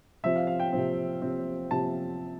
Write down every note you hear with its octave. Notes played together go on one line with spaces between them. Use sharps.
C3 F3 C4 E5
F5
F5
G5
C3 F3 C4
C3 F3 C4
C3 F3 C4 A5